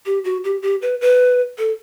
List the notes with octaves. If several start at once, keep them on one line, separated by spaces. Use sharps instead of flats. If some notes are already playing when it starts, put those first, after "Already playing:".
G4
F#4
G4
G4
B4
B4
A4